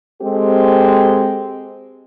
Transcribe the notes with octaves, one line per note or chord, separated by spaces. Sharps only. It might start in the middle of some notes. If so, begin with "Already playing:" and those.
G#3 C4 G4 A4